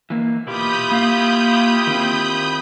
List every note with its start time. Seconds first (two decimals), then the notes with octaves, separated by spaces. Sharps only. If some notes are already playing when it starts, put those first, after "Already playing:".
0.10 E3 A#3
0.47 B2 E4 F4 G4 B5 D#6 G6
0.91 A#3 F5
1.87 D#3 C4